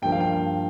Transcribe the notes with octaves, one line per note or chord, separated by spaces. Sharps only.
G2 F3 A#3 G5
F5
G5